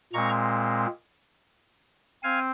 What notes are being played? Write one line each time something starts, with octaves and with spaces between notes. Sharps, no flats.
A#2 G#3 C4 A#5 C#6
C4 F5 G#5